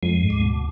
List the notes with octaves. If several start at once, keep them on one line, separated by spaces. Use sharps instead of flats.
F2 G#3
G#2
D2
B2